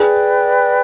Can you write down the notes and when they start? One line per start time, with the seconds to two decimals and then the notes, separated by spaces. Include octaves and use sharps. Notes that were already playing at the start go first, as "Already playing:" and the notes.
Already playing: G#4 B4 D5 G5